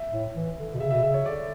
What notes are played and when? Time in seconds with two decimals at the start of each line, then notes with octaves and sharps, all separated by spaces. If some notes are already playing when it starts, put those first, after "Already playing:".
Already playing: E5
0.11 A2
0.34 E3
0.57 D3
0.74 B2
0.80 C#3 E5
0.91 B2 E5
1.03 C#3 E5
1.14 C#5
1.25 D3 D5